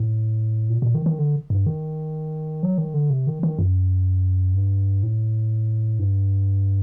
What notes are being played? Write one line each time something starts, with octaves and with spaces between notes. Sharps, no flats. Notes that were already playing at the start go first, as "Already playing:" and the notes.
Already playing: A2
A#2
A#2
D#3
D#3
D3
G2
D#3
F#3
D#3
D3
C3
D#3
D#3
F#2
G2
A2
G2